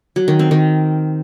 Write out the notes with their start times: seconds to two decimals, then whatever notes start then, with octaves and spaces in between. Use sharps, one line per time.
0.16 F#3
0.28 D#3
0.39 C4
0.51 D#3